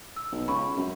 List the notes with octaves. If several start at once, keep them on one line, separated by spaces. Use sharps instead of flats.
E6
B1
C#2 B5 C#6
F#2